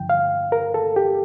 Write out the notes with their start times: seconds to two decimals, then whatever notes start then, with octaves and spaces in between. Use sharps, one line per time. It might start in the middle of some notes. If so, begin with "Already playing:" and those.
Already playing: G2 D3 F3 G5
0.10 F5
0.52 A#4
0.74 A4
0.96 G4